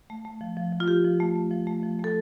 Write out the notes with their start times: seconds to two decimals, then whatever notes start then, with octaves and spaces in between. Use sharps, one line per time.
0.10 A3
0.25 A3
0.41 F3
0.57 F3
0.73 F3
0.80 F4
0.88 F3 G4
1.04 F3
1.20 A3
1.35 A3
1.51 F3
1.67 A3
1.83 F3
1.99 A3 A4